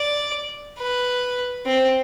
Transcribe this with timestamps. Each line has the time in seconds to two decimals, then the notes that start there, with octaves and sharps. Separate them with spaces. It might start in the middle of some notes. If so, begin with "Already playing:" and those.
Already playing: D5
0.79 B4
1.66 C4